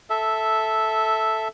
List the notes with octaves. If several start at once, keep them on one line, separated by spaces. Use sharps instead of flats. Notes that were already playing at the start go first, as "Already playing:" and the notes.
A4 E5